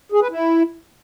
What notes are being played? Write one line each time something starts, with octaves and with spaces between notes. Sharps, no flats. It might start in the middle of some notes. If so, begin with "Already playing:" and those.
G#4
B4
E4